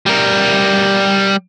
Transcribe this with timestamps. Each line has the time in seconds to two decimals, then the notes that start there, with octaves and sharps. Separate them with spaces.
0.06 G3 A#4